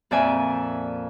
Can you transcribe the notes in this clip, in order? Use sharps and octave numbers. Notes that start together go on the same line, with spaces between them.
F2 A#2 D5 E5 G#5